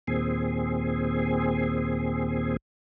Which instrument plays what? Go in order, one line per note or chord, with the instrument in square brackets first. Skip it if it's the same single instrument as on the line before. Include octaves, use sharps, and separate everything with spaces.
[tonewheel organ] D#2 A#2 C4 G#4